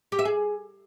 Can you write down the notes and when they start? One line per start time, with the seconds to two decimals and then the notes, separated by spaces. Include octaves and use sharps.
0.12 G4
0.19 E5
0.25 G#4